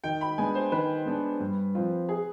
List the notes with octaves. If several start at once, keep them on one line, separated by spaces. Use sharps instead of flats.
D#3 G5
B5
G#3 B3 D4 G#5
C5
D#3 B4
G#3 B3 D4
G2
F3 C4 F4
G#4